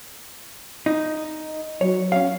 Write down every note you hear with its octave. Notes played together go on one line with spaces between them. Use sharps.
D#4
F#3 C#5
C#4 F5